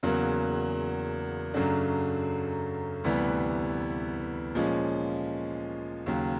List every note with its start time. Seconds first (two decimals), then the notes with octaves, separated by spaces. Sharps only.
0.03 E2 C#3 F#3 A#3
1.54 F#2 C#3 F#3 A3 D4
3.04 D2 C3 E3 G3 B3
4.55 A#2 F3 G#3 C#4
6.06 D#2 C#3 F#3